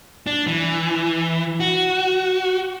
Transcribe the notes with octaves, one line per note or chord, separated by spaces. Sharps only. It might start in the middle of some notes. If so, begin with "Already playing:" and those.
D4
E3
F#4